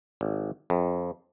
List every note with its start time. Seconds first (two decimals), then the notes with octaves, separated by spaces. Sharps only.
0.21 G#1
0.70 F2